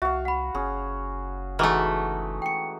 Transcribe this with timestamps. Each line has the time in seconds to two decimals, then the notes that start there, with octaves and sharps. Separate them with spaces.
0.02 C2 F#4 E5 F5
0.25 F#5 B5
0.55 F#1 C#4 G#4
1.59 E3 G#3 A3 D#4 F#4 A5 D6 F6
2.42 G5 C#7